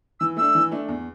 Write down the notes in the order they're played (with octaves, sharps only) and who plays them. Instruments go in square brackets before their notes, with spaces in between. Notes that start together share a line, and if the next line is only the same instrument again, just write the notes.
[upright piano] E3 [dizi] E6
[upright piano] A3 D4 [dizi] E6
[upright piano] E3
A3 D4
E2